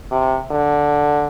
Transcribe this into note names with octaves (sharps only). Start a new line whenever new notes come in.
C3
D3